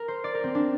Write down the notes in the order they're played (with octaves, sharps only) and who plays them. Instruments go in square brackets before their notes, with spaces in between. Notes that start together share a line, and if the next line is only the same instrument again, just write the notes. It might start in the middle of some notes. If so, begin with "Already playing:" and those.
Already playing: [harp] A#4
C5
D5
A#4
C4
D4